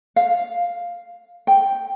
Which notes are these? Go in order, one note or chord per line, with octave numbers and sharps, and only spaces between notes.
F5
G5